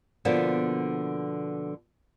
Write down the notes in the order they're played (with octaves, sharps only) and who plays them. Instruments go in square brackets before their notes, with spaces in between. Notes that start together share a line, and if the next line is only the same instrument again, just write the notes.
[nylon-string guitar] B2 D3 F3 A#3 B3 D4